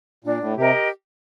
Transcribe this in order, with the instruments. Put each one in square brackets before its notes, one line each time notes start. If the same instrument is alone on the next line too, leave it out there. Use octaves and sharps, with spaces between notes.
[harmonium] A#2 [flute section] D4
[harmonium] A2
[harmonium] C3 [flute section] G4 A#4 D#5